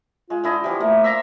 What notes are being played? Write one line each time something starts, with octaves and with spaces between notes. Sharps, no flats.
G#3 F4
D3 E4 D#5
E3 F3 G4
A3 A#3
E5 A#5 C6